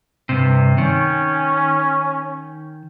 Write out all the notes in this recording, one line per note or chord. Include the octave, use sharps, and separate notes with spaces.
G2 C3
D#3 C#4